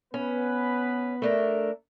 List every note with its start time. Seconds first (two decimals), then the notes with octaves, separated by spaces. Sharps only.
0.14 B3 C#4 B4
1.22 A3 D4 A#4